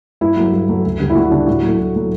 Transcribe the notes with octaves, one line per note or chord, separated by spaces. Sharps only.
G2 E4
F#3 A3
G2
F#3 A3
D2
D3 G3
E4
D2 F#4
D3 G3 D4
A2 F#4
F#3
A3
A2
F#3 A3